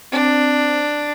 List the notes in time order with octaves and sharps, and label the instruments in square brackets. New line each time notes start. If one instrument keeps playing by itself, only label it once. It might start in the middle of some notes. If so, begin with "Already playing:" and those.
[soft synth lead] C4 [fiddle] D4